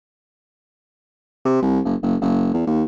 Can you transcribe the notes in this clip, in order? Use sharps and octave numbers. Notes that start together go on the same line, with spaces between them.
C3
C2
F#1
F#1
F#1
E2
D#2